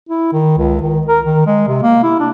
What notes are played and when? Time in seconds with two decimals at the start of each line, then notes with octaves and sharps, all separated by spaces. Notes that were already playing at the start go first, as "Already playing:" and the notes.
0.09 E4
0.33 D#3
0.58 C#2
0.81 D#3
1.07 A#4
1.25 D#3
1.47 G#3
1.68 C3
1.83 A#3
2.03 E4
2.20 D4